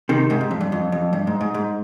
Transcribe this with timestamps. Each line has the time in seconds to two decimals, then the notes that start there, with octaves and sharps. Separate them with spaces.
0.09 C3 D#3
0.30 G#2 C3
0.41 G#2
0.51 F2
0.61 G2
0.72 F2
0.92 F2
1.13 G2
1.27 G#2
1.41 G#2
1.54 G#2